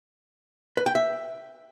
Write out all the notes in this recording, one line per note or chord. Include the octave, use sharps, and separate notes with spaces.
B4
G5
E5